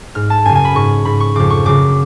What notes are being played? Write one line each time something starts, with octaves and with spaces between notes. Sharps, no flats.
G#2 F6
A5
F#2 C#3 G#5
G#5
B5
G#2 C#6
G#2 B5
C#6
F2 C#3 D6
C#6
F#2 C#3 D6